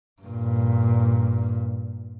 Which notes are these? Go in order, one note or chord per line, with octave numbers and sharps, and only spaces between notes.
G2 A#2